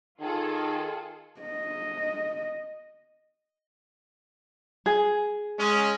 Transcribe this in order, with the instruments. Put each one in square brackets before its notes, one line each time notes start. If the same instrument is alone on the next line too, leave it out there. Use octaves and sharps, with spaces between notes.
[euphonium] D#3 [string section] F4 G#4 A4
[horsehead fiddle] D#5
[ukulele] G#4
[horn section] G#3 C#4